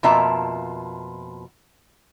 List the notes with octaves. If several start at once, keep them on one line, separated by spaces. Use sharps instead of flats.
F2 B2 A#3 F4 E5 A5